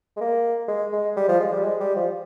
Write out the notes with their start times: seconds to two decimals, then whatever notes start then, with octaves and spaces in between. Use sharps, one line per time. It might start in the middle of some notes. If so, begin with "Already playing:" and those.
0.17 G#3
0.21 A#3
0.68 G#3
0.92 G#3
1.17 G3
1.28 F3
1.40 G#3
1.52 G3
1.64 G#3
1.80 G3
1.96 F3